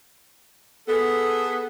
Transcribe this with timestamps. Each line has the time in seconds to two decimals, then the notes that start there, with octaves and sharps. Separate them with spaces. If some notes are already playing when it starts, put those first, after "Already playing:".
0.87 B3 G#4 A4